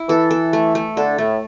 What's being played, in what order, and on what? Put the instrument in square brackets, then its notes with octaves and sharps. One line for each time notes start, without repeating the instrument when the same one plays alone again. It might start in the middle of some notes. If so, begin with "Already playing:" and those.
Already playing: [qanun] E4
[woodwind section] E3 [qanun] A4
[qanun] A4
A3
A3
[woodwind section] D3 [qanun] A4
[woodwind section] A2 [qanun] A3